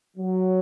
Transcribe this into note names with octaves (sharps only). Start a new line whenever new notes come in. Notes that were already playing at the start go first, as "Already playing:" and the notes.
F#3